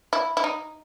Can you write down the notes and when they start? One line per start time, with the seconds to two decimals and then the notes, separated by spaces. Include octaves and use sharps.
0.13 E4
0.37 E4
0.44 D#4